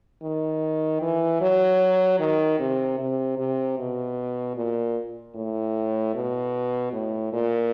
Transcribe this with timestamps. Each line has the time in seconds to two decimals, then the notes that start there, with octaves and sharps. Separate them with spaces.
0.23 D#3
1.02 E3
1.41 F#3
2.20 D#3
2.59 C3
2.99 C3
3.38 C3
3.78 B2
4.56 A#2
5.35 A2
6.15 B2
6.93 A2
7.33 A#2